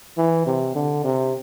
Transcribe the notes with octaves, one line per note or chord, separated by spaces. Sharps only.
E3
C3
D3
C3